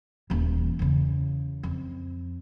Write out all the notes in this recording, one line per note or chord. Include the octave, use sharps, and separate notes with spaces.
D#1 E3
E2 C#3
F2